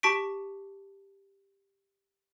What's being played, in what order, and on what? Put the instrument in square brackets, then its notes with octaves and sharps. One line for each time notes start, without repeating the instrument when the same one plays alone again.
[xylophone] G4 A5 C#6 B6 D7